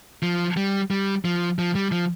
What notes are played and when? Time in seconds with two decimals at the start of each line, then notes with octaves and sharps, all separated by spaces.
0.23 F3
0.57 G3
0.91 G3
1.25 F3
1.59 F3
1.75 G3
1.92 F3